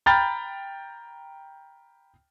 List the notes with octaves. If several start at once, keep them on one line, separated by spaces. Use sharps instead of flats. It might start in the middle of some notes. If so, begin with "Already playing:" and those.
G5 A#5 B5 F6 G6 A6